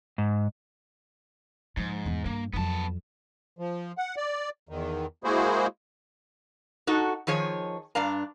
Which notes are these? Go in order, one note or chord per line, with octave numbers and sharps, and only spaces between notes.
G#2
G#2 F3
E2
G2 A#3
F2 F#3 B3 A5
F3
F#5
D5
E2 D#3
G#3 A#3 E4 F#4 G#4 C5
D#4 F#4 A4
D#3 F3 G#4 C#5
G2 D4 D5 F5 A#5